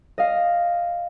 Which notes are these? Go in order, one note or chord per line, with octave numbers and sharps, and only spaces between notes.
D#5 F5